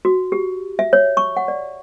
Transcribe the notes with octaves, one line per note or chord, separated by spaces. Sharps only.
F#4
G4
E5
C#5
C#6
F#5
D5